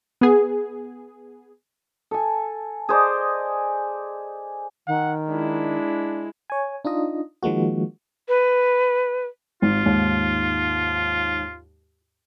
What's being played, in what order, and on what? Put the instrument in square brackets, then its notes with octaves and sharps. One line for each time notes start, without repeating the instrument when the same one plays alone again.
[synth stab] B3 G#4
[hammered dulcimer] A4 G#5
G#4 C5 D5 D#5
[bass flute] D#3 [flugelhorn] F#5
[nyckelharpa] G#3 E4 [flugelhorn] D4
[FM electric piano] C#5 G#5
D4 D#4 F4 D#5
D#3 F3 G#3 A#3 F#4
[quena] B4
[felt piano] G#1 [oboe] F4
[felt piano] D#2 G#2